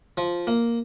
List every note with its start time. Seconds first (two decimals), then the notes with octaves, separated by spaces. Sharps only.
0.17 F3
0.47 A#3